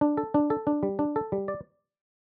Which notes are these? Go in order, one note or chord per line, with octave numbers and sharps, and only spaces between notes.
D4
A4
D4
A4
D4
G3
D4
A4
G3
D5